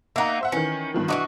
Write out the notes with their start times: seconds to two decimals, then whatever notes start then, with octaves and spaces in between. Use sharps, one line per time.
0.16 A#3 D#4 E5 F#5 A#5
0.41 C5 E5 F#5
0.52 D#3 E3 C#4
0.94 G2 D#3 F3
1.08 E3 F3 D4 F#4 D#5 C#6